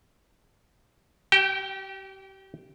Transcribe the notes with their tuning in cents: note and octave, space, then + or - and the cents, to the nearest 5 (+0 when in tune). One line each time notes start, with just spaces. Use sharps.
G4 -35 G5 +0